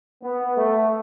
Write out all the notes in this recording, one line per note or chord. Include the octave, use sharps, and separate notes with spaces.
B3
A3